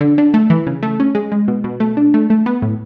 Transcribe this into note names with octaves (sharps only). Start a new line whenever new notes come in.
D3
D3
A3
E3
C#3
A3
C#4
G#3
G#3
B2
B2
A3
D4
A3
A3
B3
A2